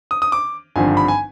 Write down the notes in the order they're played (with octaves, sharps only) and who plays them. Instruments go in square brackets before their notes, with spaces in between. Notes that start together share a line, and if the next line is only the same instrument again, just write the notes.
[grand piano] D#6
D#6
D6
G#1 G2 D3 F3 C4 G#5
B5
G#5